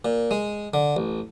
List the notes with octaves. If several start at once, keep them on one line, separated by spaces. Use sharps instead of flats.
A#2
G#3
D3
A1